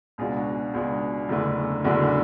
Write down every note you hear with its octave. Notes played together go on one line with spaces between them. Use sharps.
C#2 B2 G#3 D4 G#4
F#4
C#2 B2 G#3 D4 G#4
F#1 E2 D3 A3 D4
F#1 E2 D3 A3 D4 F#4
A4